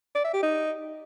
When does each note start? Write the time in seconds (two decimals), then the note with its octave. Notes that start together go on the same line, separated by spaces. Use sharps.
0.15 D5
0.24 E5
0.33 G4
0.43 D#4